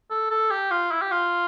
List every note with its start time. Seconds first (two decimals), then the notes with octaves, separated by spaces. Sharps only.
0.10 A4
0.31 A4
0.51 G4
0.71 F4
0.92 E4
1.02 G4
1.11 F4